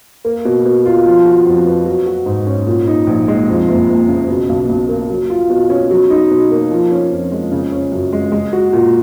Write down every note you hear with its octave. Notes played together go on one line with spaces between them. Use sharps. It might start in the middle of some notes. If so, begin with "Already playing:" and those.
A#3
B2
B2
F4
F3
F#4
F2
B3
F#3
F#4
G#2
C#4
A#2
D#4
A#1
G#3
F2
F#1
F#1
C#3
B2
B1
B1
A#3
F#3
F4
B2
C#4
F#3
D#4
B2
A#3
F3
C#4
F2
G#3
C#3
C#4
F#2
G#3
G#3
F#4
A#2